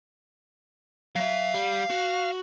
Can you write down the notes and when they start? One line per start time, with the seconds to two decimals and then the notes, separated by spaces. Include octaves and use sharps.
1.16 F#3 E5 F5
1.54 G3
1.90 F#4